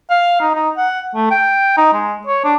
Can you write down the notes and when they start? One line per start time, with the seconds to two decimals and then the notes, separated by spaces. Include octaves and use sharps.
0.10 F5
0.41 D#4
0.55 D#4
0.77 F#5
1.15 A3
1.31 G5
1.77 D#4
1.94 G#3
2.27 C#5
2.44 D4